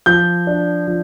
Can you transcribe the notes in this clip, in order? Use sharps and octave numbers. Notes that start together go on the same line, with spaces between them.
F3 G6
D4
F3